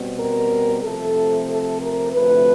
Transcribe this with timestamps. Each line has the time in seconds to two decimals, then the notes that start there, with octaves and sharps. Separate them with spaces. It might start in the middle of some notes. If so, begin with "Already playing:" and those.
Already playing: B2 G3 C4
0.19 A#4
0.83 C3 F3 A3 A4
1.48 A4
1.80 A#4
2.12 D2 C3 F3 A3 B4